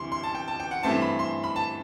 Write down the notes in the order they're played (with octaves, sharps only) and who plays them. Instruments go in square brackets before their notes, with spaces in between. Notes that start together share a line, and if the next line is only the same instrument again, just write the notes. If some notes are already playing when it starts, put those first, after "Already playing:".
Already playing: [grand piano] D2 C3 E3 G3 C6
C6
A5
G5
A5
G5
F#5
G2 E3 A3 C4 A5
B5
C6
B5
A5